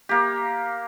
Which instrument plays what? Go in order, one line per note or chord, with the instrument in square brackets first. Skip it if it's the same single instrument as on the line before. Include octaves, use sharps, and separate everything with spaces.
[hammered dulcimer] A#3 G4